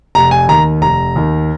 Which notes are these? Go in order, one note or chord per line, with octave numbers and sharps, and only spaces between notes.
F1 A#5
G#5
D#2 D#3 A#5
F1 A#5
D#2 D#3